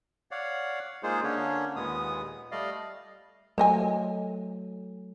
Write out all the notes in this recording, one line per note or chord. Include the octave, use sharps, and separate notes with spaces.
C#5 D5 F5 F#5
G#3 A#3 D#4 F4 G#4 C5
D3 A#3 C#4 D4 C#5
D#2 A#2 G#3 B3 D#6
G3 A3 D5 D#5 F5
F#3 A3 C5 D#5 G#5